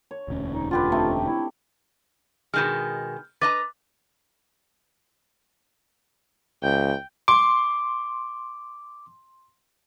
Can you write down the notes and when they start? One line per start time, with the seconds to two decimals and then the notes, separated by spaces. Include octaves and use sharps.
0.11 C#5
0.28 E1 D2 C#4
0.52 D#4
0.71 D3 F4 G4 B4
0.92 A3 C4 D#4
1.25 E4
2.54 B2 D#3 G#3 F6 G6
3.41 B4 D#5 A#5 D6 A6
6.63 C#2 G5
7.28 C6 D6